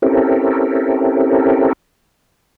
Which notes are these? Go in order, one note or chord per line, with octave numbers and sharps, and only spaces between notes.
C4 C#4 E4 G4 A4 A#4